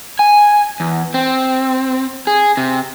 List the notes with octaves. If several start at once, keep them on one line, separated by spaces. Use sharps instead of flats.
G#5
E2
C4
G#4
C3